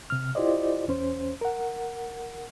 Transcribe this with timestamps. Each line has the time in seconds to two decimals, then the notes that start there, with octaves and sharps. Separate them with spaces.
0.10 C3 F6
0.35 E4 F4 G4 C5 D5 D#5
0.88 E2 C#4 C5
1.41 A#4 F#5